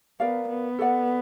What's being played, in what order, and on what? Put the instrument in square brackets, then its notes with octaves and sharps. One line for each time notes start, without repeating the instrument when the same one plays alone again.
[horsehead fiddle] B3 [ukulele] A#4 D5 F5
[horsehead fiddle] B3
[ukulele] A4 D5 F#5